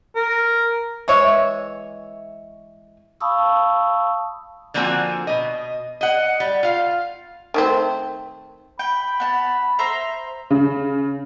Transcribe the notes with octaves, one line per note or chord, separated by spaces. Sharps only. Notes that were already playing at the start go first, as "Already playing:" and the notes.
A#4
E3 G#3 C#5 E5
F5 A5 B5 C#6 D#6 E6
D3 F3 A#3 C4 F#4 G#5
B2 D#5
D#5 F#5
G3
F4 F5
D#3 A3 C4
G5 B5
B3 A5
C5 E5 A#5
C#3